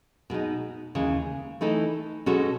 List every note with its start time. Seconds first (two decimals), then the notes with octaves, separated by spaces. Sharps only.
0.30 B2 G#3 D#4
0.95 D#2 C#3 E3 G#3
1.61 E3 A3 D#4 A4
2.26 B2 G#3 C#4 F#4 A4